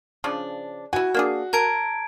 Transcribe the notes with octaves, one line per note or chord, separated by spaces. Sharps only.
C#3 F3 D4
E4 F#4 G#5
A#3 D4 G#4
A#4 A5 G#6 D7